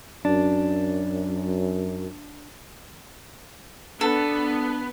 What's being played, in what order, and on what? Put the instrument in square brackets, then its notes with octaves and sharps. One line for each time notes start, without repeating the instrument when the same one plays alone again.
[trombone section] F#2 [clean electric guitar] D4
[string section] B3 [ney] D4 [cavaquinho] A4